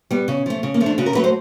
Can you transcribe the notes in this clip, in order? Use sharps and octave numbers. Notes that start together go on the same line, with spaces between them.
G3 B3
C#3
F3 A3
C#3
A#3
F3 A3
D4
C#3 F#4
A#4
F#3 A3 B4
C5